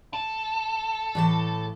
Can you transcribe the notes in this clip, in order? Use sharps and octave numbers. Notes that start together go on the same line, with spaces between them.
A4
A2 E3 A5